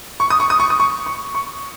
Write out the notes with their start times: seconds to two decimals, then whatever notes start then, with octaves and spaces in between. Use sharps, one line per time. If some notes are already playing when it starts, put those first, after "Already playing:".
0.20 C#6
0.30 D#6
0.40 C#6
0.50 D#6
0.60 C#6
0.70 D#6
0.80 C#6
1.06 C#6
1.35 C#6